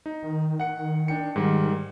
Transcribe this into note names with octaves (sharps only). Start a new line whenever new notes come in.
D#4
D#3
F#5 C#7
D4 G5 C#7
G#2 G3